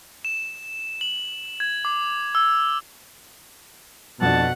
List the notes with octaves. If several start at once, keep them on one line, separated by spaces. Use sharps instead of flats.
E7
F#7
G#6
D6
E6
F2 B2 D4 F#5 A5